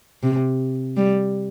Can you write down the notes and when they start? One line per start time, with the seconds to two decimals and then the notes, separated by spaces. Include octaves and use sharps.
0.23 C3
0.97 G3